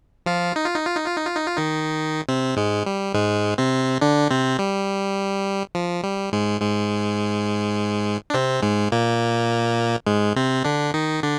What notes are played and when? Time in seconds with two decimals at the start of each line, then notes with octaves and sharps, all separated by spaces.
0.26 F3 F4
0.56 D#4
0.66 F4
0.75 D#4
0.87 F4
0.96 D#4
1.06 F4
1.17 D#4
1.27 F4
1.36 D#4
1.47 F4
1.57 D#3 D#4
2.29 C3 C4
2.57 G#2 G#3
2.86 G3
3.14 G#2 G#3
3.58 C3 C4
4.01 D3 D4
4.31 C3 C4
4.59 G3
5.75 F3
6.03 G3
6.32 G#2 G#3
6.61 G#2 G#3
8.30 D4
8.34 C3 C4
8.62 G#2 G#3
8.92 A#2 A#3
10.07 G#2 G#3
10.36 C3 C4
10.65 D3 D4
10.94 D#3 D#4
11.23 D3 D4